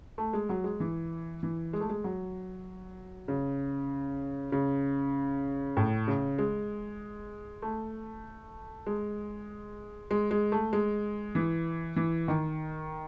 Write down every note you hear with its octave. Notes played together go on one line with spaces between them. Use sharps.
A3
G#3
F#3
G#3
E3
E3
G#3
A3
G#3
F#3
C#3
C#3
A2
C#3
G#3
A3
G#3
G#3
G#3
A3
G#3
E3
E3
D#3